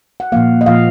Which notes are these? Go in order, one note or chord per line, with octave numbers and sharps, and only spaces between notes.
F#5
A#2 F3 A#3 F5
D#5
A#2 F3 A#3 F5